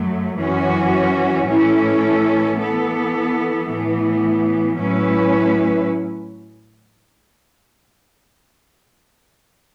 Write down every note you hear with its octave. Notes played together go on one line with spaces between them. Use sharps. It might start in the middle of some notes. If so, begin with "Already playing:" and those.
Already playing: F#2 F#3 A3
F#2 E3 C#4 F#4
A2 E3 C#4 E4 A4
E3 B3 A4
A2 E3 B3
A2 F#3 C#4 E4 B4